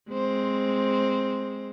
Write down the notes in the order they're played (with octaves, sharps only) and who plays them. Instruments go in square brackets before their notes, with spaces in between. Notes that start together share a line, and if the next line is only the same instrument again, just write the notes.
[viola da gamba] G#3 C4 C5